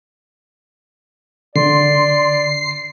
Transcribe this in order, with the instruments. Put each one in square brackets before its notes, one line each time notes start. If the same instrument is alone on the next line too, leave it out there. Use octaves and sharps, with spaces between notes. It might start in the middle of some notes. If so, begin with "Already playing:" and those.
[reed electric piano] D3 [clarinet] D5 [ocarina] C6 [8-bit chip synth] C7